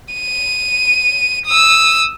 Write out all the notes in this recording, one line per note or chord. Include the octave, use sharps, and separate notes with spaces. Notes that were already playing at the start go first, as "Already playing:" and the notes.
D#7
D#6 E6